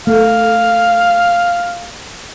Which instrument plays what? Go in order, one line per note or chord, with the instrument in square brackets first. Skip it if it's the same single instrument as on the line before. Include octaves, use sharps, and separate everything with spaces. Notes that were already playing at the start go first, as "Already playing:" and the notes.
[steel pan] A3 [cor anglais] F5